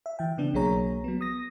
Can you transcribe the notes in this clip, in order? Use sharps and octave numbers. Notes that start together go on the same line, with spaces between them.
E5
E3 G5
C#3 B3 D4
B1 F#3 A#3 G#4 C#5 A#5
F#3 B3
D#6 A#6